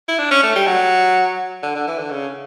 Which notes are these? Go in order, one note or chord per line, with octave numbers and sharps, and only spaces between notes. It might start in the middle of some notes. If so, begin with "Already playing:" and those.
E4
D4
C#4
A3
G3
F#3
D3
D3
E3
D3
C#3